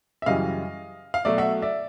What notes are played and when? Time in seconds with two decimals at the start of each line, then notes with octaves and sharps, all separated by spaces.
0.22 E5
0.26 F#2 C#3 E3 G3 D#5 F5
1.14 F5
1.25 B2 F#3 A3 D5 E5
1.38 E5 F#5
1.62 D5 E5